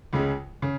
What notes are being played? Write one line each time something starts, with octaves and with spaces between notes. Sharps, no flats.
C#2 C#3 G#3
C#3